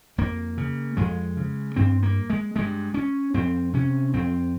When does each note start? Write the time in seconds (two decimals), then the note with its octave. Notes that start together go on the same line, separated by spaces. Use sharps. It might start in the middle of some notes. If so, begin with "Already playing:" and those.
0.18 F2 A#3
0.57 C#3
0.97 F2 G#3
1.37 C#3
1.76 G2 C4
2.03 A#3
2.30 G#3
2.56 G2 G#3
2.94 C#4
3.34 F2 C4
3.73 C3 C#4
4.14 F2 C4